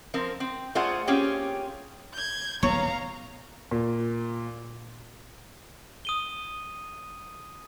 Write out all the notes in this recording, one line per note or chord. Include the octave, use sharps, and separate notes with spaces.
F3 C4 A#4
C4
A3 F4 G#4 C5 D5 F#5
A#3 C4 C#4 F4 G4 G#4
G6 G#6
D#1 B1 B3 C#5 F5 A#5
A#2
D#6 D#7 G7